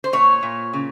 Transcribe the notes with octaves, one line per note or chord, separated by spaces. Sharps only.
C5
A#2 C#5
A#2
C#3